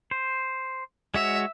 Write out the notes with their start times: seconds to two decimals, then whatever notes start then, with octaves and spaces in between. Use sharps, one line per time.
0.11 C5
1.14 G#3 F#4 C#5 E5